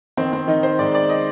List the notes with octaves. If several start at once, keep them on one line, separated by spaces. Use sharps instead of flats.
D#3 C4
C4
D#3 D#4
C5
G#2 D5
D5
D#5